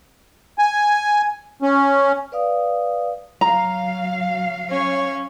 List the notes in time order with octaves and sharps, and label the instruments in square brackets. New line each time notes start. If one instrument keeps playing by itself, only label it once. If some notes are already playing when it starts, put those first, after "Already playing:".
[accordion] G#5
C#4
[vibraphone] B4 D5 F5 D#6
[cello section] F#3 F5 [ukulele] A#5
[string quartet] C#4 C#5